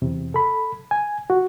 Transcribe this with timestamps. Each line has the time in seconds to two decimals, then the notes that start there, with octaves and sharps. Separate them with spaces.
0.02 E2 C3
0.34 A4 B5
0.91 G#5
1.30 F#4